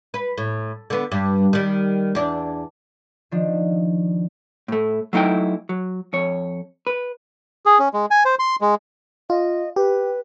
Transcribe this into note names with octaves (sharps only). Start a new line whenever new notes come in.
B4
A2
D3 B3
G2
D#3 G3
E2 D4
D#3 F3 D4
A2 A3
F#3 A3 D#4 E4 G5
F#3
F2 C#5
B4
G#4
C#4
G#3
G#5
C5
C6
G#3
F4 D#5
G4 B4